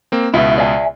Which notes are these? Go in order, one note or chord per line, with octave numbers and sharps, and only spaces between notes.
A#3 C4
C#2 B2 E4 E5
D5 E5 G#5